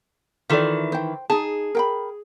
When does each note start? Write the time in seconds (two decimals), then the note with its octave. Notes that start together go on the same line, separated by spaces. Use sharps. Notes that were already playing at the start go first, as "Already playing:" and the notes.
0.50 D#3 E3 F4 A4 D5
0.92 C5 G5
1.30 D#4 G#4 A5
1.75 A#4 G5 B5